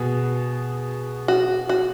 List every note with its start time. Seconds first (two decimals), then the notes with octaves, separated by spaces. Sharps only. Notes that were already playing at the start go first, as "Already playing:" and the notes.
Already playing: B2 B3 F#4 G#4
1.28 F#4
1.69 F#4